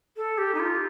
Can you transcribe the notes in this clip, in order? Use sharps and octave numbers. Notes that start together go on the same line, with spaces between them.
A4
G4
D#4
F4